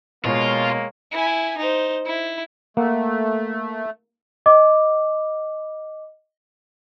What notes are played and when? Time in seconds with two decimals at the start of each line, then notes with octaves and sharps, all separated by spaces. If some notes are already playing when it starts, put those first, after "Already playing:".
0.25 B2 G#3 A#3 F4 C#5
1.12 E4 G#5
1.57 D#4 C5
2.06 E4
2.77 A3 A#3 F#5
4.46 D#5 D6